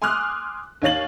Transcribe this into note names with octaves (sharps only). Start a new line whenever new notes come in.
G#5 C6 D6 D#6 F6 F#6
D#2 D#4 C#5 F5 A6 F#7